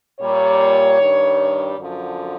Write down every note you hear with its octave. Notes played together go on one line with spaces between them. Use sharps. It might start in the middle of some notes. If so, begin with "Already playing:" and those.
A#2 G3 C#5
G2 D#3 G3
F#2 D3 F3